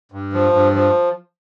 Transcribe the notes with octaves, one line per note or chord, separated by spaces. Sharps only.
G2
F3
G2
F3